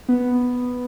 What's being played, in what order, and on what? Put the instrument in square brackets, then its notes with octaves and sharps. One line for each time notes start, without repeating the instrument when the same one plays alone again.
[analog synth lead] B3